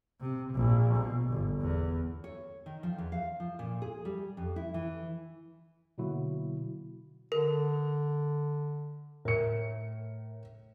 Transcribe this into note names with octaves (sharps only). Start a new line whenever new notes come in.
C3
A#1
B2
G1
E2
C#5
D#3
F3
E2
F5
F3
A#2
G#4
G3
F2
E4
E3
B2 D3 F#3 A#3 E4 F#4
D3 A#4
A2 A#4 C#7